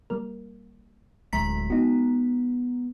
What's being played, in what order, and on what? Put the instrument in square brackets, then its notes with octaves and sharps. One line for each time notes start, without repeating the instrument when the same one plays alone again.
[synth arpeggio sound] G3 A#3 A#4
[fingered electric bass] D1 D2 [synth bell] G#3 A#5 B6
[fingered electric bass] B3 [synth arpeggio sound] D#4 F#4